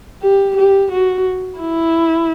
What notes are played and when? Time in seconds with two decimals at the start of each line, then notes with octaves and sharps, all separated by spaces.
0.22 G4
0.57 G4
0.91 F#4
1.59 E4